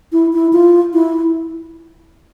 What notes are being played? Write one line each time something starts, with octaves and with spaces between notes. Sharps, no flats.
E4
E4
F4
E4